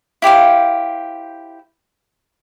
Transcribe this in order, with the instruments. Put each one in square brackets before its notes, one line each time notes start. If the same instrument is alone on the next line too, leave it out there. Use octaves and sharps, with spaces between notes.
[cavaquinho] E4 G4 C5 F5